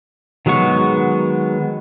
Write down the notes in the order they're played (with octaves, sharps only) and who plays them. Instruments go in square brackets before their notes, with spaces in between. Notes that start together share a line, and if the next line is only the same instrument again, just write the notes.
[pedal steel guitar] D#3 F#3 G#3 B3 C#6